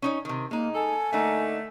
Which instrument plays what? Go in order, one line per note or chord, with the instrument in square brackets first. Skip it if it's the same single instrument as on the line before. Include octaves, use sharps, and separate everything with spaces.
[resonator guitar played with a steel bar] C#4 D#4 C#5
C3 D#3
[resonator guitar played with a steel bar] G#3 D#4 [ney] A#3
[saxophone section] A4 [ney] G#5
[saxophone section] D3 A3 [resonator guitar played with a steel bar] A#3 D#4